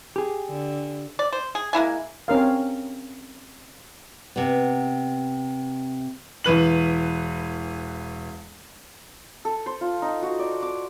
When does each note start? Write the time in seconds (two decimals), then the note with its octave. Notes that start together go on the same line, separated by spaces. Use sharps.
0.16 G4 G#4
0.49 D3
1.19 D5
1.33 C5
1.55 G#4
1.73 G#3 A#3 E4 G#5
2.28 C4 C#4 A#4 F5
4.36 C3 B3
6.44 E1 E3 B4 F#7
9.45 A4
9.66 C5
9.81 F4
10.02 D#4
10.22 F#4
10.39 D5
10.62 D6